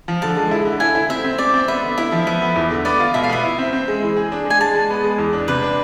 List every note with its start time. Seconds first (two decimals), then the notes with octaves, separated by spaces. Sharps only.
0.08 F3
0.22 D3 A5
0.37 G#3
0.51 E4
0.65 D3
0.80 E4 G#5
0.95 E4
1.10 C4 E5
1.24 C4
1.38 C4 D5
1.54 C4
1.68 B3 E5
1.83 D3
1.98 E4 E5
2.12 F3
2.27 B3 E5
2.42 B3
2.56 E2
2.71 D3
2.85 B3 D5
3.00 F4
3.14 B2 E5
3.24 F5
3.29 B3 E5
3.44 E4
3.58 C4
3.73 C4
3.88 G#3
4.02 E3
4.17 G#4
4.32 D4
4.45 G#3
4.50 G#5
4.60 G#3 A5
4.75 G#3
4.90 B3
5.04 G#3
5.18 E2
5.33 D4
5.48 C3 B4
5.62 D4